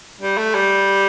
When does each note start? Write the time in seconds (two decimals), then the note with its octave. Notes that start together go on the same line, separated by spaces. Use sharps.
0.21 G3
0.38 A3
0.55 G3